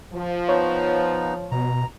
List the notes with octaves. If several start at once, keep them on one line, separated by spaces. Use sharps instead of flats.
F3
B3 D#4 C#5 A#5
B2 A#5